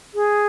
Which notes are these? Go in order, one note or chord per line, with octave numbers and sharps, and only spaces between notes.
G#4